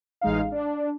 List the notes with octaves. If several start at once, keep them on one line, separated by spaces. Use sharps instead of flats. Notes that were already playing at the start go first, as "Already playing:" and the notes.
A1 G#3 D#4 F5
D4